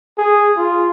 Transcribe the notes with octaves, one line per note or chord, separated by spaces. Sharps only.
G#4
F4